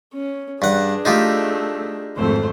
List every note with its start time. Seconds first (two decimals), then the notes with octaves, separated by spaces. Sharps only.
0.13 C#4
0.62 G2 D4 G#4 F#5
1.05 A3 D#4 F4 G4
2.17 G#1 F2 A3 A4 C5